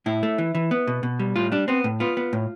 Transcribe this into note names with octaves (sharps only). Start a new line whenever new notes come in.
A2 E4
A3
E3
E3
B3
B2
B2
G3
A2 F4
G3 D4
B3 C4
A2
B3 F4
B3
A2